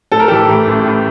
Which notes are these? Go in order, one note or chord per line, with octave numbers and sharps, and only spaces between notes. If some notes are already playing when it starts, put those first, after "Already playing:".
A2 A4
A#4
E3 G4 A4
A2
A1
A2